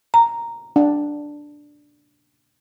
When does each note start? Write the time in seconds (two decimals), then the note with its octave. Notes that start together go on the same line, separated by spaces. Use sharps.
0.14 A#5
0.76 D4